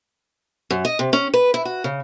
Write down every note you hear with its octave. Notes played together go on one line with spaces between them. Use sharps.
F#2
D#5
C3
C#4
B4
E4
F#4
C#3